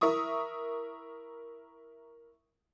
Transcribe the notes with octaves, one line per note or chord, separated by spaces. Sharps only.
E4 A#4 E5 C#6 D#6